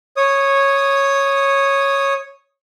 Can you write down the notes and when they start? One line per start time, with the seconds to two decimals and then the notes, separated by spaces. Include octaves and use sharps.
0.17 C#5 D#6